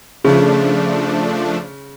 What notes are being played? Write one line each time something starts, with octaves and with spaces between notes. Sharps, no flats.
C#3 F3 A3 D4